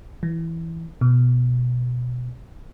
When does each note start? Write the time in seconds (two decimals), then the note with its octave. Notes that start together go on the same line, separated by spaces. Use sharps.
0.23 E3
1.01 B2